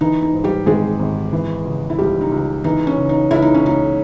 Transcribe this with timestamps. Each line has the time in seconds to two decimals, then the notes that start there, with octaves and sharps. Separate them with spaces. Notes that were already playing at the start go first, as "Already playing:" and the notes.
0.01 E3 D#4
0.22 D#4
0.33 G#2
0.44 G3 G4
0.66 G#1 G#3 G#4
0.99 G#1
1.33 E3
1.65 C#3
1.90 E4
1.98 C#2 G3 G4
2.21 D#4
2.32 C#2
2.64 E3 D#4
2.87 C#4
2.97 C#3
3.09 D#4
3.31 C#2 E4
3.42 D#4
3.54 C#4
3.64 C#2 D#4